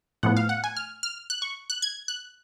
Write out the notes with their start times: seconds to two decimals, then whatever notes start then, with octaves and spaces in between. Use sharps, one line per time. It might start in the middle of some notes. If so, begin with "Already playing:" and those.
0.23 A2 F3 B3 F#5
0.37 F5
0.49 F#5
0.64 G#5
0.77 F6
1.03 F6
1.30 F#6
1.42 C#6
1.70 F#6
1.82 G#6
2.08 F#6